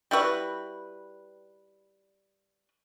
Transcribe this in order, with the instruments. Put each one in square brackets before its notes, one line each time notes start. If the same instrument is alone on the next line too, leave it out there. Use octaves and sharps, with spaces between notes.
[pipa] G3 E4 F#4 B4